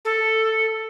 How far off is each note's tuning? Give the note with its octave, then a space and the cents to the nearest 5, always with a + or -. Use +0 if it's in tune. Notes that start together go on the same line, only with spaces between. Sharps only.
A4 +5